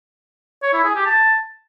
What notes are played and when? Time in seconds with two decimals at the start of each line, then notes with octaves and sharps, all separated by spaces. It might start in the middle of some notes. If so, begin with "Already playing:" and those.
0.63 C#5
0.73 E4
0.84 G#4
0.95 G4
1.06 A5